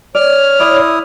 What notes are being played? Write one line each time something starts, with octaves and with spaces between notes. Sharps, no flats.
C#5 D5 F6
E4 D5 D#6